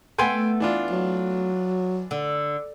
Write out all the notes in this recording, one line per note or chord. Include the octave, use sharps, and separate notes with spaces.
A3 B3 G5 G#5 C6
E3 D4 F4
F#3
D3